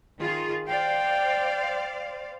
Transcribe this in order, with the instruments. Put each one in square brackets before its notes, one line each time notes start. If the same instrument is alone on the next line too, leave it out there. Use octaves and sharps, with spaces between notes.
[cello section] D#3 F4 G#4
[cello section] C5 D5 F5 [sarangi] G5